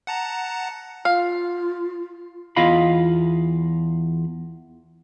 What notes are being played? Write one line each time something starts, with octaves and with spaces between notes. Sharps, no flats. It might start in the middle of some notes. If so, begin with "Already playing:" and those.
F#5 A5 A#5
F4 F5
E2 F4 D#5 F5 B5